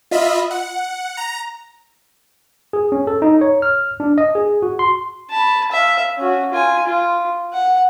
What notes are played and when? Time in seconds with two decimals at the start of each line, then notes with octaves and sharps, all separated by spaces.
0.11 F4 D#5 E5 B5
0.51 F#5
1.17 A#5
2.73 G#4
2.92 C#4
3.07 A4
3.22 D#4
3.41 C#5
3.62 F6
4.00 D4
4.18 D#5
4.35 G#4
4.62 F#4
4.79 C6
5.30 A5 B5
5.71 E5 F5
6.17 C#4 F#4
6.52 F4 G#5
6.86 F4
7.53 F#5